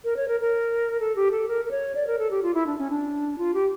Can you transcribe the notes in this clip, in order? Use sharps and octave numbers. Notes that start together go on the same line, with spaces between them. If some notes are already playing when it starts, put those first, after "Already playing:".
A#4
C#5
A#4
A#4
A4
G4
A4
A#4
A#4
C#5
D5
A#4
A4
G4
F4
E4
D4
C#4
D4
F4
G4